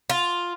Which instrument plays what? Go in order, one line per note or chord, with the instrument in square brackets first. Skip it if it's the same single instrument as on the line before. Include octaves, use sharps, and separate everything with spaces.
[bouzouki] F4